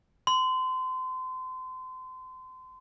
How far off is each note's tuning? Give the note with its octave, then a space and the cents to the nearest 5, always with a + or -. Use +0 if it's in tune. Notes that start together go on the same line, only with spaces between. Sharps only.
C6 -30